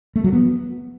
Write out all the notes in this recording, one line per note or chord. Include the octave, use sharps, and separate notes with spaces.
A3
F#3
B3